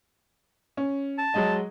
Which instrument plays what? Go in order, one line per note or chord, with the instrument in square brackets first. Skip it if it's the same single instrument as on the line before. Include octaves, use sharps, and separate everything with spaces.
[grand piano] C#4
[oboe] A5
[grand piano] F#3 G#3 D#5